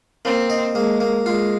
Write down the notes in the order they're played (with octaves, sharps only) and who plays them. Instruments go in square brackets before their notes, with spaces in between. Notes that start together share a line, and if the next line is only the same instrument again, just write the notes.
[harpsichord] A#3 [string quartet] C4
[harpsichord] D#5
[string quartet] G#3 [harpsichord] A#3
[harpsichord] A#3
[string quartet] G#3 [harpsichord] F4